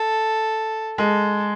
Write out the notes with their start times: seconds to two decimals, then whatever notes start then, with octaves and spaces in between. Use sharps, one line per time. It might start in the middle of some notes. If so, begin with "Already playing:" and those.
Already playing: A4
0.98 G#3 A4